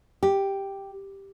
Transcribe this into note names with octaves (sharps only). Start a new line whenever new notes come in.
G4